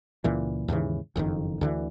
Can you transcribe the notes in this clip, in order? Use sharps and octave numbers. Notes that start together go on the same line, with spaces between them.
C#2 A#2 E3
D#2 G#2 C#3 E3
F#1 F2 A2 D#3
D2 D3 E3